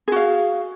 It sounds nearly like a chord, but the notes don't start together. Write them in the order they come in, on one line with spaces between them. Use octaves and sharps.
G#4 F#4 F5